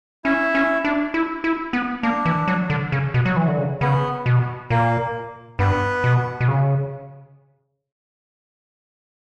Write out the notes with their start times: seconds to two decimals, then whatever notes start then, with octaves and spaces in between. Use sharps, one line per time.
0.24 C#4 E4
0.55 C#4
0.85 D4
1.14 E4
1.44 E4
1.73 B3
2.03 A#3 D4
2.25 E3
2.48 F#3
2.70 D3
2.92 C#3
3.14 B2
3.25 F#3
3.36 E3
3.48 D3
3.59 C#3
3.81 C#3 B3
4.26 B2
4.70 A#2 A#3
5.59 G2 B3
6.04 B2
6.41 B2
6.48 C#3